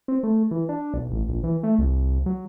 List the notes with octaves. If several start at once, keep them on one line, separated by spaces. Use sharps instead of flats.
C4
A3
E3
D4
B1
A1
A#1
E3
A3
C2
F#3